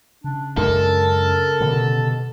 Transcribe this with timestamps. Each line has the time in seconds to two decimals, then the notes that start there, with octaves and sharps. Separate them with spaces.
0.24 C#3 D4
0.57 F#2 G#3 D4 A4 A#4
1.60 G2 B2 D3